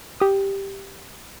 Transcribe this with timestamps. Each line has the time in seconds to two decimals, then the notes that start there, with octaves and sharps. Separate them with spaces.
0.20 G4 D#6